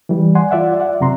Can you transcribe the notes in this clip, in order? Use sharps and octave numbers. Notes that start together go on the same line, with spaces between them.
E3 G3
D5 F#5 G#5 C6
F4 D5 E5 F#5
D5 E5 F#5
F#2 C3 A#5 C6